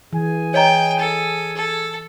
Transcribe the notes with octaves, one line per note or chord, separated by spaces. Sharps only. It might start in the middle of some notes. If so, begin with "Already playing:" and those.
E3 G#4 G#5
C#5 D#5 G5 A#5
A4
A4